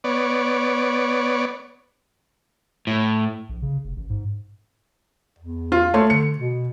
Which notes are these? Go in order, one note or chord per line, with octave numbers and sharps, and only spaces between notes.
B3 C#5 D5
A2
A#1
C#3
F1
A1
G#2
E2
F4
A3 C#5 C6
D3 C#7
B2